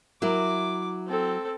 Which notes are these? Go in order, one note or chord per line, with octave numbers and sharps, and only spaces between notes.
F#3 E4 A#4 D6
C4 A4